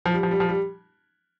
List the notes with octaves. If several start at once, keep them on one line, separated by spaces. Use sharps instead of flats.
F3
G3
F3
G3
F3
G3